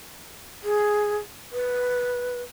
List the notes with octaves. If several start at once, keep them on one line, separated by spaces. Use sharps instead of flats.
G#4
B4